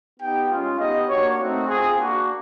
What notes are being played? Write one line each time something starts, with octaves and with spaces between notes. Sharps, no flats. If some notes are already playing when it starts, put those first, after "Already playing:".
B3 D#4 G4 G5
G#3 C#4 F4
B3 D#4 G4 D#5
A#3 D4 F#4 C#5
A3 C4 D#4 F#4
C4 F4 G#4
A#3 D4 F#4